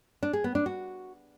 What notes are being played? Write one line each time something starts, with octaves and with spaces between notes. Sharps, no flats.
D4
G#4
B3
D4
F#4